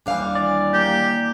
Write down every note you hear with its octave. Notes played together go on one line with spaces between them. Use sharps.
D#2 E3 G3 D4 F5
D5
A#3 G4